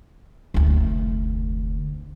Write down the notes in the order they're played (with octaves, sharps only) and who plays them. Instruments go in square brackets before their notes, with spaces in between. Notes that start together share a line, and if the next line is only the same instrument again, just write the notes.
[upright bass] F1 D2